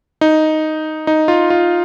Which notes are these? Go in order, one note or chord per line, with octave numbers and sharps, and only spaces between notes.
D#4
D#4
F4
F4